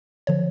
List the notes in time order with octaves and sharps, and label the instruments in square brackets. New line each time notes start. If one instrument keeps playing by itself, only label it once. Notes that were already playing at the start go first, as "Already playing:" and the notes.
[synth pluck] D3 F3 C#5